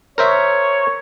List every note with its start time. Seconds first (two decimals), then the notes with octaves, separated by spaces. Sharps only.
0.18 A#4 C5 C#5 E5